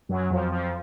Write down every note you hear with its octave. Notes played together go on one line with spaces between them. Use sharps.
F#2 F#3
F2 F3
F2 F3